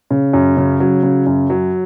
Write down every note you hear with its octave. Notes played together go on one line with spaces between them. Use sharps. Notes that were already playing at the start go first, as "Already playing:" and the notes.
C#3
F#2
C#3
F#3
C#3
F#2
F#3